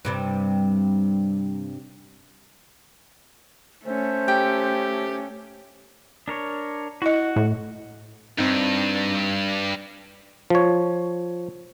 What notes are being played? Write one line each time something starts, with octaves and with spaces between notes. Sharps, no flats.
G2 C3 G3
A3 C#4 C5
G4 G5
D4 A#4 C#5
E4 F#4 D#5 F#5
A2
G2 C4 D#4
F3 C#5